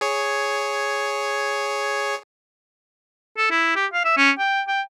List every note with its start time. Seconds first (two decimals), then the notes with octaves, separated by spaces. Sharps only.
0.01 G#4 C#5
3.38 A4
3.51 E4
3.76 G4
3.93 F5
4.05 E5
4.17 C#4
4.39 G5
4.68 G5